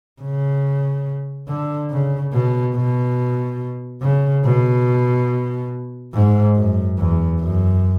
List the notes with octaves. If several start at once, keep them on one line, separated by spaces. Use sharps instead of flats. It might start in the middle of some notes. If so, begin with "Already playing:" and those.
C#3
D3
C#3
B2
B2
C#3
B2
G#2
F#2
E2
F#2